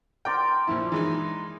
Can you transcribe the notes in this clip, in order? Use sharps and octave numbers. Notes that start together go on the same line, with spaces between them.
A#4 D5 G5 C6
A#1 F3 E4
E3 G#3 D#4